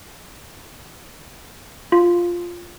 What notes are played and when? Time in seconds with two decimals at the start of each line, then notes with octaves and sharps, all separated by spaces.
1.92 F4